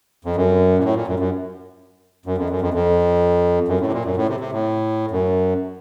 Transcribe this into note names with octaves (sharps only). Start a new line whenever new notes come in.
F2
F#2
A#2
A2
A#2
F#2
F#2
F#2
F2
F#2
F2
F2
F#2
A2
C3
A#2
F#2
A2
C3
C3
A2
F#2